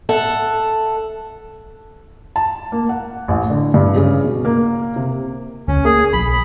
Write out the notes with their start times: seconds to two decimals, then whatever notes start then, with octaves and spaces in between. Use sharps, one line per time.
0.09 A4 E5 F#5 A5
2.36 A5
2.72 A#3
2.89 F#5
3.28 A1
3.50 D3
3.74 G2
3.96 C#3
4.24 B2
4.45 A#3
4.96 C3
5.68 D2 C#4
5.85 A#3 G#4
6.13 B1 B5